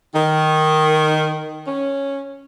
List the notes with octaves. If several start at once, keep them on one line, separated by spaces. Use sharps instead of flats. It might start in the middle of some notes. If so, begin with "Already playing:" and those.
D#3
C#4